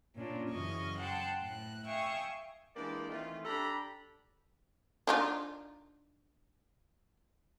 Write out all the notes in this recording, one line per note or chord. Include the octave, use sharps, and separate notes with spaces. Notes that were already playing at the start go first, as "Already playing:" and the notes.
A#2 C#4 D4 F4
F#2 C#3 E3 D#5 C#6 F6
F#5 G5 A5 C6
A2 F#6
E5 F5 G5 G#5 C#6 D#6
E3 G#3 A#3 D4 G4 D5
D#3 E3 A3 C4 F4
D4 G4 A4 A#5 B5
D4 D#4 F4